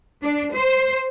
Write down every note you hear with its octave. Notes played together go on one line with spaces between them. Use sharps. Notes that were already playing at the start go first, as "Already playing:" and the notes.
D4
C5